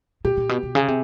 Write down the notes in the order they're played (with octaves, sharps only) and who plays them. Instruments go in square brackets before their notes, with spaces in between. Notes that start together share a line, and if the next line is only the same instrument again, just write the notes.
[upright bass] A#2 [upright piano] G4
[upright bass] A#2
B2
B2
[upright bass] C#3 [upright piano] G#4
[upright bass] C3